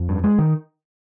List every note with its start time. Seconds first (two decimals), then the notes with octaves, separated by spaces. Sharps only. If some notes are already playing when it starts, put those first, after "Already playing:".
Already playing: F2
0.09 G2
0.24 G#3
0.39 D#3